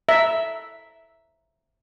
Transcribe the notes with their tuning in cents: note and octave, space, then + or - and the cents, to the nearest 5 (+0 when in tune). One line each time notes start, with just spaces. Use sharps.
E5 +0 A#5 +0